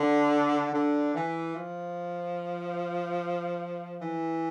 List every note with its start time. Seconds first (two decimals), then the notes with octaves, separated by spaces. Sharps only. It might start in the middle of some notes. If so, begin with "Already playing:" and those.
Already playing: D3
0.73 D3
1.14 E3
1.54 F3
4.00 E3